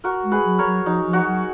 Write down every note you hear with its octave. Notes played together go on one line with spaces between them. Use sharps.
F#4 A#4
G#3
G#4 B4
F#3
A#4 C#5
F#3
F3 D#4 F#4
F3
D#4 F#4
F#3